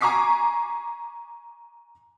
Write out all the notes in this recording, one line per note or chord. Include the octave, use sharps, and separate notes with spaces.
G#5 A#5 C#6 D6 B6 C7